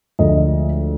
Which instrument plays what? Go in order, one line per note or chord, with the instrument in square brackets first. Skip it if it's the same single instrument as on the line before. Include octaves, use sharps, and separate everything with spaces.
[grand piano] D2 D3 F3 G#3 D#5